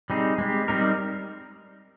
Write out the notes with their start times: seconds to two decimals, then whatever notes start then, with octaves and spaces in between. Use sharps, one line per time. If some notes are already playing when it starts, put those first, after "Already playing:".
0.10 G3 C4 D#4 G#4
0.38 G#3 C4 G4
0.68 G3 C4 D#4 A#4